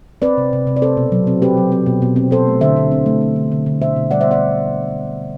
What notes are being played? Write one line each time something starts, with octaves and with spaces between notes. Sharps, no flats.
C4 B4 D5
C3
C3
C3
D5
C4 A4 C5
B2
F#3
C4
C4 G4 B4
F#3
C4
B2
B2
C4
B2 A4 C5
A3
D3 C5 E5
D3
C4
A3
C4
D3
D3
D3
B2 C5 E5
B2
G3 D5 F#5
C5 E5
B3 D5 F#5